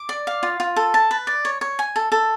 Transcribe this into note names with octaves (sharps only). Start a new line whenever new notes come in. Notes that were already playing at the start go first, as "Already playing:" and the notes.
Already playing: D6
D5
F5
F4
F4
A4
A5
B4
D5
C#5
C#5
G#5
A4
A4